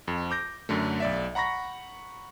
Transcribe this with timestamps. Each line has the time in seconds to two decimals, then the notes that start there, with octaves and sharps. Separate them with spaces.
0.08 F2
0.31 D6 G6 A#6
0.69 F#2 D3 A3
1.00 B1 D5 E5
1.35 F#5 A#5 B5 C#6 A#6